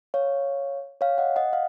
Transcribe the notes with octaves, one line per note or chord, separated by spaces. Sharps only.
C#5 F5
C#5 F5
D#5 F#5
D#5 F#5
F5